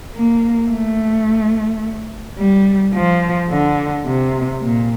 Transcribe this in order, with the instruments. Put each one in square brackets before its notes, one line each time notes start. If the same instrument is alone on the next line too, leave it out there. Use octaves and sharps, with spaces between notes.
[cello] A#3
A3
G3
F3
D3
C3
A#2